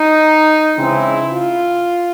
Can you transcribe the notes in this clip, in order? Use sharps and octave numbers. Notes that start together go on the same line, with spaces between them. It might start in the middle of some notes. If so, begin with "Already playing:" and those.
Already playing: D#4
C#3 E3 G#3 C4 E4
F4